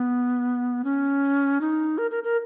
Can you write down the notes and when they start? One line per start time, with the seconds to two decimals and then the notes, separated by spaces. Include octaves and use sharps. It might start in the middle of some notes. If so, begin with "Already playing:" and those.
Already playing: B3
0.84 C#4
1.61 D#4
1.98 A#4
2.11 A#4
2.24 A#4